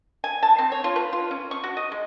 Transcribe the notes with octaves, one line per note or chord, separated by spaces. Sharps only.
G#5
A5
C4
C#5
F4
B4
F4
C#4
C#6
F#4
D#5
G#3